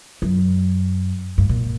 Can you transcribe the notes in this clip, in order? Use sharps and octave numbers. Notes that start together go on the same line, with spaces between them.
F#2
G2
A#2